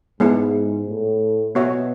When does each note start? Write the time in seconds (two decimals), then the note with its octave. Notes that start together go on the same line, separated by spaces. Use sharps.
0.20 G#2 G#3 B3 E4
0.88 A2
1.55 B2 B3 F#4 C#5 E5